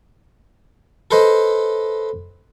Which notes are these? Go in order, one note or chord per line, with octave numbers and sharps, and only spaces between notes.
A4 B4 C5 D#5